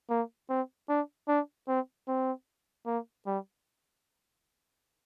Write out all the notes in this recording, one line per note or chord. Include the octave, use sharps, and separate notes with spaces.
A#3
C4
D4
D4
C4
C4
A#3
G3